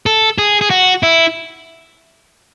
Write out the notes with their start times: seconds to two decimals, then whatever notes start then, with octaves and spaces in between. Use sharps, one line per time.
0.06 A4
0.38 G#4
0.61 G#4
0.70 F#4
1.03 E4